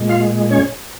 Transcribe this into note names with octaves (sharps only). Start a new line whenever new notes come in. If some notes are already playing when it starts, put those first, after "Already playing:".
Already playing: A#2 G#3
F4 F5
C#4 C#5